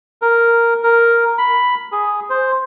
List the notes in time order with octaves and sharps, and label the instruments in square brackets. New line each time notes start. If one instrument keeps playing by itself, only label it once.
[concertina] A#4
A#4
B5
G#4
C5